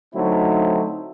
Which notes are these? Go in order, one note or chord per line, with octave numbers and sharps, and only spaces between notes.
D3 F#3 A3 C4 D#4 E4